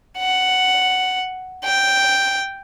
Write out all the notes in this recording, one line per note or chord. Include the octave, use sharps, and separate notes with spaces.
F#5
G5